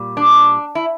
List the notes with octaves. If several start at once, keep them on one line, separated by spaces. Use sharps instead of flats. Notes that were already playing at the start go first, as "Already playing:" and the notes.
Already playing: A#2 G3
D4
E4